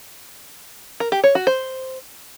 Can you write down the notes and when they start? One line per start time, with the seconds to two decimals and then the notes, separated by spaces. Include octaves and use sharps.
1.00 A#4
1.12 G4
1.24 C#5
1.35 F#4
1.47 C5